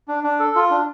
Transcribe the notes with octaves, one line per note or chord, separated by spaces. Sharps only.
D4
D4
A4
F4
D4